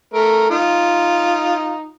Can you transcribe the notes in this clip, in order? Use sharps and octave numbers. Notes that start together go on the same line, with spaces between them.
A3 A#4
D#4 F4